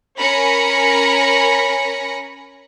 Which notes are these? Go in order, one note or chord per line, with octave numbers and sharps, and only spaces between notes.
C#4 A#4 G#5 B5 A#6 C#7